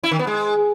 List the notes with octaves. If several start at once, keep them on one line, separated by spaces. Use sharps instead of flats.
E4
D#3
B3
G#3